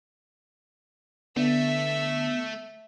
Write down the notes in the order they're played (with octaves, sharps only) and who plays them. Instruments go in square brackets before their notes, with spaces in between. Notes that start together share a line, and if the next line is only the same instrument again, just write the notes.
[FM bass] D3 [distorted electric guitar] A3 [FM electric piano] B3 [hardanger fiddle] E5